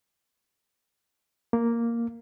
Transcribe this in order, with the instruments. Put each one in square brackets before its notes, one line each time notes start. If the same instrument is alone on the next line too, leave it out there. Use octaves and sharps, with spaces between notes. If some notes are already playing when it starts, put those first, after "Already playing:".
[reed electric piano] A#3